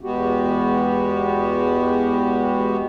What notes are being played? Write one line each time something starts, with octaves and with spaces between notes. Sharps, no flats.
E2 G#3 B3 F#4 G4